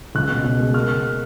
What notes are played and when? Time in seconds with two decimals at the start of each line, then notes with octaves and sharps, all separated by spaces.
0.15 C#2 F#6
0.30 B2
0.45 B2
0.60 G#3
0.74 A#3 F6